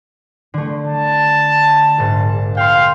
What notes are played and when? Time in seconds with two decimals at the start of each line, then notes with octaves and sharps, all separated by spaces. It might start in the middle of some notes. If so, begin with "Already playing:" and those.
0.54 D3 A3
0.87 A5
1.98 A#1 G#2
2.57 F5 G5 C6